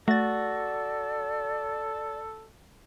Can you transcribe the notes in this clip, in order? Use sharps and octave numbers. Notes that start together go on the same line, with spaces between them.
A3 F#4 A4 D5 A6